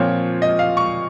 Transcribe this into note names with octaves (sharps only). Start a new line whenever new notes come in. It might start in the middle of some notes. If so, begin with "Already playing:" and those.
Already playing: A#2 F3 C4 F4 C#5
D#5
F5
C#6